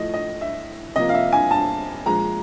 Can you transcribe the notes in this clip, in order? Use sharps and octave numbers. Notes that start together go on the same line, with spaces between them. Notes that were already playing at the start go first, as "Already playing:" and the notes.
Already playing: A2 F3 A3 D#5
D#5
E5
C3 F3 A#3 D#5
F5
E5
G#5
A5
A#2 F3 G#3 A#5